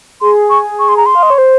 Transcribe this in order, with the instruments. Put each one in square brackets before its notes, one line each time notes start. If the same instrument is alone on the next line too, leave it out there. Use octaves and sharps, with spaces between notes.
[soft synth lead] G#4 [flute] C6
[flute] C#6
C#6
C6
A#5
C6
[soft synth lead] F5
D#5
C#5
C5